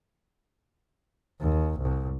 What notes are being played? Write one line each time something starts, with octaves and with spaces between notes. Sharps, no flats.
D#2
C2